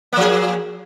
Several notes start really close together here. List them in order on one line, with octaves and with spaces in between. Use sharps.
A#3 F3 G#4